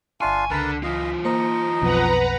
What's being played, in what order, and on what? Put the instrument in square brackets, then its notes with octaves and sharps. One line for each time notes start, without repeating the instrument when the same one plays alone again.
[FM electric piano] G1 E5 C#6 [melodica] D4 F4 F5 [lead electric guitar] G#5
[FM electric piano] C#2 B6 [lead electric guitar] D3 [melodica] A#4 B4 A5
[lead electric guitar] E3 F4 [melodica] D#5 F5
[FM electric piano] A#3 C5 C#7 [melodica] D#4 D#5
[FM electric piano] B1 F2 B2 [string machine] B4 F#5 A#5